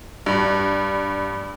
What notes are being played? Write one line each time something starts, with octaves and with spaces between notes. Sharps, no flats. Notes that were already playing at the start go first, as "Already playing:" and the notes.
G2